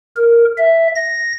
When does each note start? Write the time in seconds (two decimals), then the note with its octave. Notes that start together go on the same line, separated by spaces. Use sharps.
0.16 A#4
0.58 E5
0.95 A#6